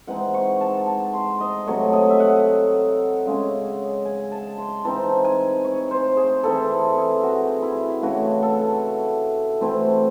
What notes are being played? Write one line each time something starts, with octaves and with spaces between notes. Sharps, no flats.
E3 G#3 C4 D#4 F#5
C#6
A5
A5
C6
D#5
C3 F#3 A3 C#5
D#5
E5
F#5
C#3 G#3 C#4
G#5
A5
C6
E3 C4 D#4 A5
G#5
C#5
C5
G#4
E3 C4 E4 A4
G#4
F#4
E4
C#3 E3 A3 F#4
A4
E3 A3 C4 E4